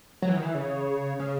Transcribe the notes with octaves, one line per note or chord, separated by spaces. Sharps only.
F#3
E3
D#3
E3
C#3
C#3